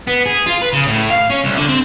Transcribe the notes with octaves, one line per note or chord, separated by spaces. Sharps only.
B3
G#4
F4
B4
C#3
A2
F5
C#4
C2
D3
C4